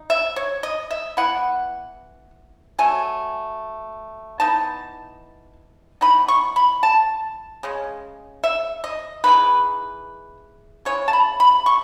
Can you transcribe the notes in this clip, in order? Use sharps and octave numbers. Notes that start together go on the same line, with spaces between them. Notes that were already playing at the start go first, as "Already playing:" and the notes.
Already playing: D#4
E5
C#5
D#5
E5
E3 B3 E4 F#5
F#3 A3 G#5
E3 B3 D#4 A5
E3 B3 D#4 B5
C#6
B5
A5
C#3 G#3 C#4
E5
D#5
E3 G#3 D#4 B4
C#3 E3 G#3 C#5
A5
B5
B5
C#6